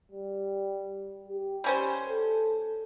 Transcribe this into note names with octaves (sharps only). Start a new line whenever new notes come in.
G3
G4
G3 C#4 C5
A4